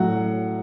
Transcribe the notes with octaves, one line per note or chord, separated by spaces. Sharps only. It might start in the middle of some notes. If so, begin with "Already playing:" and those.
Already playing: A2 F#3 F#4 F#5